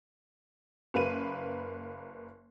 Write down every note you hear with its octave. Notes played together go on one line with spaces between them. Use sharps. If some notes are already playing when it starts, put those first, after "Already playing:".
F#1 A#3 B4 D#7